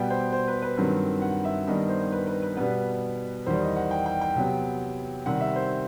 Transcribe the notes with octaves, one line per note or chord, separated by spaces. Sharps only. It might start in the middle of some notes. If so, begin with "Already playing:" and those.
Already playing: B2 G3 B3 G5
C5
C5
B4
B4
G2 D#3 F#3 C4
F#5
E5
G2 D#3 G3 B3 D#5
C5
B4
B4
B4
B2 G3 B3 B4
E2 D#3 G3 C5
D#5
F#5
G5
G5
G5
C3 F#3 B3
C3 D#3 G3 C4 F#5
E5
C5